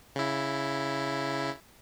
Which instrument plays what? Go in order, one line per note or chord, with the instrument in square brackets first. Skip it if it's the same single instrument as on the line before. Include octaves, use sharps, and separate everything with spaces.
[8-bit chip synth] C#3 E4